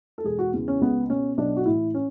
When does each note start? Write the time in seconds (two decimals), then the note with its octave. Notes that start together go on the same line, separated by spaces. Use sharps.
0.18 A4
0.24 E1 G#4
0.39 F#4
0.53 E2 C#3
0.68 C#4
0.81 C#2 B3
1.09 B2 C#4
1.37 B1 D4
1.56 F#4
1.66 A2 E3 E4
1.94 C#4